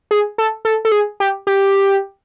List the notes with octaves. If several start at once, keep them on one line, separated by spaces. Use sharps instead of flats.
G#4
A4
A4
A4
G#4
G4
G4